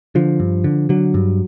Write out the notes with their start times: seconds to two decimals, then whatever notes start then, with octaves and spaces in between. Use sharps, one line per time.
0.15 D3 F3
0.40 G2
0.64 D3
0.89 D3 F#3
1.14 G2